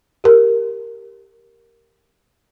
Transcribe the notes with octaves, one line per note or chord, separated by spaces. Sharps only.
G4 A#4